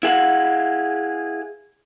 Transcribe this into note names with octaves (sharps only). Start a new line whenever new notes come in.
E4 G#4 F5 F#5